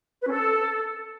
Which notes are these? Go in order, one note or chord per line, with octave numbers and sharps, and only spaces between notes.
B4
C#4
A4